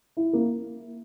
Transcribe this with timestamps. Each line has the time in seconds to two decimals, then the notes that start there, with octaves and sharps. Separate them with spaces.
0.17 E4
0.33 A#3